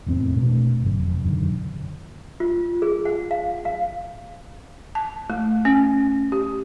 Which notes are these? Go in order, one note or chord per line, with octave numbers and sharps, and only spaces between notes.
F1 E2 A2 C4
B2 A3 D4
G1 F#2
F1
E1 F#2 D3 D#3
F4
G#4
F#5
F5
F5
A5
A3
C#4
G4